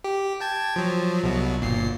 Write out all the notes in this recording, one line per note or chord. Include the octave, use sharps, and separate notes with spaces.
G4
G5 A5 G#6
F3 F#3
C2 B2 F#3
G1 A#2 C7